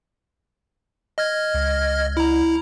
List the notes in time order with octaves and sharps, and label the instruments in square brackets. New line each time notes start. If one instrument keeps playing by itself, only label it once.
[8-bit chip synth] D#5 F6 G#6
[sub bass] C#2
[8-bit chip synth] E4 A#5